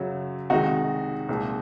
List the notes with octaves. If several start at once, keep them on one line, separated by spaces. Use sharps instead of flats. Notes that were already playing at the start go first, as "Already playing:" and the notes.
Already playing: F#2 C#3 F#3
C2 C3 D#3 G#3 D#4 F#4
C2 A#2 F3 G#3